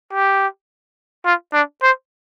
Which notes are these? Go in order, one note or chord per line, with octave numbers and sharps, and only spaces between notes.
G4
F4
D4
C5